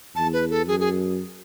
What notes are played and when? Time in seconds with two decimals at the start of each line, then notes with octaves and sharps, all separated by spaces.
0.16 E2 A5
0.33 B4
0.50 A4
0.68 F#2 G#4
0.80 G#4